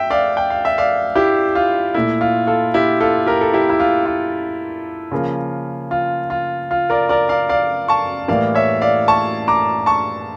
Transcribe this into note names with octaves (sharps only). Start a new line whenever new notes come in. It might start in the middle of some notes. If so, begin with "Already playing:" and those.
Already playing: E5 G5
D5 F5
G5
F5
E5
D5 F5
E4 G4
F4
A#2 A3 E4
F4
F4 A4
E4 G4
F4 A4
G4 A#4
A4
E4 G4
E4
F4
F4
C#3 F3 A#3
F4
F4
F4
A#4 D5
A#4 D5
D5 F5
D5 F5
A5 C#6
A2 E3 G3 A#3 D5 F5
C#5 E5
D5 F5
A5 C#6
A#5 D6
A5 C#6